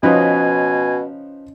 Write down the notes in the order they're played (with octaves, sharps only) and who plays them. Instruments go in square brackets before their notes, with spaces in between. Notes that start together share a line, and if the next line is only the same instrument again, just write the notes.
[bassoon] B2 [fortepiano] F3 D#4 B4 [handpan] C#4 D#5 [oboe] G#5